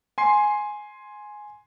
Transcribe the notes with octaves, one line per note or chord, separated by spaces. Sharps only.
G#5 C6 C7